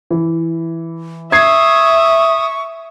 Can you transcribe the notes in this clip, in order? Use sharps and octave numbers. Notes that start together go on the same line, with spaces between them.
E3
E5 C#6 D#6 G#6 C7